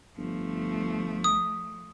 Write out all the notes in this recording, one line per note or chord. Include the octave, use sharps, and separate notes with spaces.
G1 F3 A3
D#6